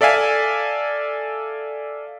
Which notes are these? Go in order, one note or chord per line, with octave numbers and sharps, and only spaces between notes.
A4 D5 E5 F5 G#5